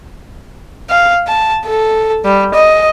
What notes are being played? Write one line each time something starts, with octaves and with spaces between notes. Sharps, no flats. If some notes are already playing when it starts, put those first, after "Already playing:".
F5
A5
A4
G3
D#5